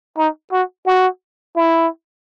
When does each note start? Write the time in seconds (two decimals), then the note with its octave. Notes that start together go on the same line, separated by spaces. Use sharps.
0.18 D#4
0.52 F#4
0.86 F#4
1.56 E4